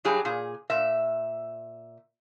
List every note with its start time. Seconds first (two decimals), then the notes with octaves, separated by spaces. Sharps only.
0.05 G2 F#3 G4 G#4
0.25 A#2 G#4
0.70 A#2 E5